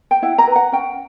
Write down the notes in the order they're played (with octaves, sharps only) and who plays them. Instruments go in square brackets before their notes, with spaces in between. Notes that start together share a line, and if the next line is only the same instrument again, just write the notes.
[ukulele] G5
E4 F#5
A#5
B4
F#5
C#4 G5